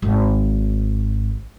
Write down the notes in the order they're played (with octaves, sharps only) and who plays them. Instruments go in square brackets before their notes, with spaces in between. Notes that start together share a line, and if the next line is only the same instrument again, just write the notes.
[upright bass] G#1